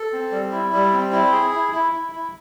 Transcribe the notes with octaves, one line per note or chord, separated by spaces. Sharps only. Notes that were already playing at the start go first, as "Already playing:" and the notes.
Already playing: A4
C4
G3
E4
G3
C4
E4
G#4
E4
E4
E4
E4